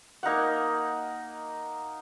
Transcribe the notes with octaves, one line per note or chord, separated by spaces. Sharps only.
A#3 D#4 F5 F#5